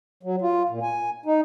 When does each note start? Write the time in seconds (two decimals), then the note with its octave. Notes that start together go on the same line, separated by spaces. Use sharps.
0.23 F#3
0.41 F4
0.69 A#2
0.82 G#5
1.25 D#4